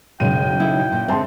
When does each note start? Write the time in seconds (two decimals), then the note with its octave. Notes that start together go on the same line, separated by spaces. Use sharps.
0.20 F#1 B1 G#3 G5 D#7
0.60 D#4 E4 A4
0.92 A#2
1.08 D3 G#3 C4 E5 A5 C6